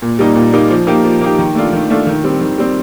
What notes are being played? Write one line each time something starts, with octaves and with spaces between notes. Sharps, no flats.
A#2
G3 A#3 D#4
A#2
G3 A#3 D#4
F3
A#3 D#4 G4
F3
A#3 D#4 G4
D#3
A3 D4 F4
D#3
A3 D4 F4
D#3
G3 C4
D#3
G3 C4